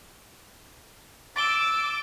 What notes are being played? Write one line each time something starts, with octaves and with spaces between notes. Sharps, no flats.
D6 E6 A6 D7 G7